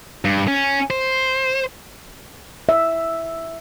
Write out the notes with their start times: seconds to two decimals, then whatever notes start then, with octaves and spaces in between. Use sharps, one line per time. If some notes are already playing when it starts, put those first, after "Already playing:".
0.25 G2
0.48 C#4
0.90 C5
2.69 E5